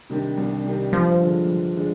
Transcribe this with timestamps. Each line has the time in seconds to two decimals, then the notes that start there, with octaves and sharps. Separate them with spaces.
0.10 C3 D#3 G3 D4
0.38 C2
0.64 C3 D#3 G3 D4
0.93 G2 F3
1.20 D3 G#3 D4 F4
1.47 G2
1.76 D3 G#3 D4